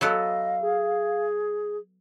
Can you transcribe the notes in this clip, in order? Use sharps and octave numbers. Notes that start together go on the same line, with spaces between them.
F#3 B3 A4 D#5 F5
G#4